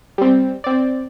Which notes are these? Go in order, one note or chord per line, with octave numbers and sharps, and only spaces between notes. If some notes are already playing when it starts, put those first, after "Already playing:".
G3 C4
C4 D5